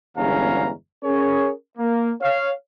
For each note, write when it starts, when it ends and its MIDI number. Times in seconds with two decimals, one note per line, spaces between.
0.18 0.71 31
0.18 0.71 40
0.18 0.71 56
0.18 0.71 61
0.18 0.71 77
0.18 0.71 82
1.04 1.51 61
1.04 1.51 68
1.04 1.51 70
1.04 1.51 73
1.78 2.11 58
2.22 2.51 73
2.22 2.51 77